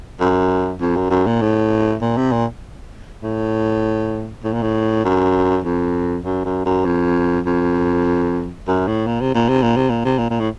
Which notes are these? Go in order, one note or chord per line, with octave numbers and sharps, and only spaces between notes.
F#2
F2
F#2
F#2
A#2
A2
A#2
C3
A#2
A2
A2
A#2
A2
F#2
F2
F#2
F#2
F#2
F2
F2
F#2
A2
A#2
C3
A#2
C3
A#2
C3
A#2
C3
A#2
A#2
A2